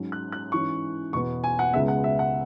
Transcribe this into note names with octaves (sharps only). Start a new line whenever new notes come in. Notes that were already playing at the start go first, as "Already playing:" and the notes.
Already playing: G#2 F#3 C#4
F#6
F#6
G#2 E3 C#4 C#6
E2 B2 B3 C#6
G#5
F#5
C#2 C#3 G#3 B3 E5
F#5
E5
F#5